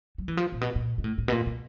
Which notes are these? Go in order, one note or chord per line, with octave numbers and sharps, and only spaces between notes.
F#3
E3
F3
A#2
B2
A#2
A#2
A2
A2
B2
A#2
B2